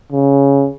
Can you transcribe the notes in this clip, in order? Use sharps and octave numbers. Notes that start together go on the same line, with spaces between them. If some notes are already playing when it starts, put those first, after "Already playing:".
C#3